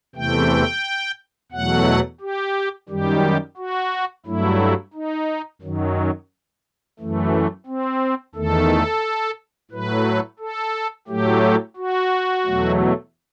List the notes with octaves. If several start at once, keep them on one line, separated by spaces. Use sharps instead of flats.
E2 C3 E3 A3 G5
E2 B2 F#3 A3 F#5
G4
F#2 D#3 G3 G4
F#4
G2 F#3 A3 E4
D#4
F#2 D#3 F#3
F#2 E3 A3
C4
E2 D#3 A3 A4
A2 F#3 A3 B4
A4
A2 F#3 A3 G4
F#4
E2 B2 F#3 A3